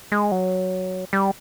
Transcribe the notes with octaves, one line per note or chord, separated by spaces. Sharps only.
G#3
F#3
G3